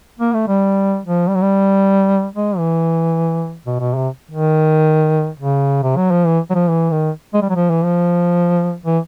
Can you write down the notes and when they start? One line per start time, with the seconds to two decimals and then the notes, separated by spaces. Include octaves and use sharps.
0.19 A#3
0.33 A3
0.48 G3
1.05 F3
1.28 G3
1.34 F#3
1.42 G3
2.36 G#3
2.58 E3
3.66 B2
3.80 B2
3.96 C3
4.31 D#3
5.40 C#3
5.83 C3
5.97 F#3
6.11 F3
6.27 E3
6.50 F#3
6.54 F3
6.69 E3
6.91 D#3
7.34 G#3
7.42 G3
7.49 F#3
7.56 F3
7.70 E3
7.85 F3
8.86 E3